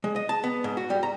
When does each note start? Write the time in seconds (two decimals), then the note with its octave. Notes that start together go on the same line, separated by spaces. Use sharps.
0.04 G#3
0.16 D#5
0.29 A5
0.44 B3
0.64 G#2
0.77 F#4
0.90 G3
1.03 A#5